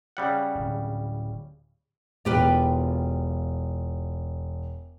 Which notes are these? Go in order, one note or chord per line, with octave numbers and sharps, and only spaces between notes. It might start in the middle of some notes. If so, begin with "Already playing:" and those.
C#3 G3 F#5
D1
E1 F4 G4 B4